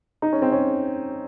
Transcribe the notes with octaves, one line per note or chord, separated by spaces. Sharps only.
D#4
C#4
C4
C#4